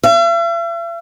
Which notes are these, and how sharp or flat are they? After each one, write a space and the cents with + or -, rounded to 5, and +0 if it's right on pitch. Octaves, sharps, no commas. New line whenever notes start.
E5 +45